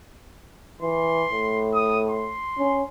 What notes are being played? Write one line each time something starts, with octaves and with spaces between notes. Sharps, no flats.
E3 C6
A2
D#6
C6
C#4